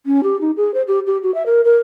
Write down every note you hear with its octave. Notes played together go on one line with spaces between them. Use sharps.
C#4
G4
D#4
G#4
C5
G4
G4
F#4
E5
A#4
A#4